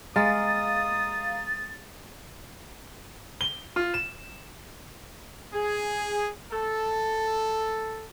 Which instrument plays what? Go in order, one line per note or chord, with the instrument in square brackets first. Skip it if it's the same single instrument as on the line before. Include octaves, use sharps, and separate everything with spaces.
[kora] G#3 [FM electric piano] F5 A#5 [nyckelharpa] D#6 [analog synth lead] A6
[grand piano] G7
F4
E7
[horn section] G#4
A4